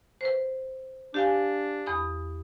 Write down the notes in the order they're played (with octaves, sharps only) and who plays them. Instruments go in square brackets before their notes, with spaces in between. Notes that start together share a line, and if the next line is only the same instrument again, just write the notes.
[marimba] B4 C5
[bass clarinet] D4 [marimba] G4 F5 G#5
[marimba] E2 B5 D#6